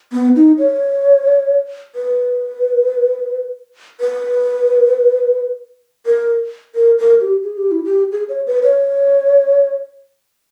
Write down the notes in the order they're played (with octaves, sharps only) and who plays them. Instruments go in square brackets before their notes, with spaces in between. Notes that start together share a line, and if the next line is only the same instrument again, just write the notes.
[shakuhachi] B3
D#4
C#5
B4
B4
A#4
A#4
A#4
G4
G#4
G4
E4
G4
G#4
C#5
B4
C#5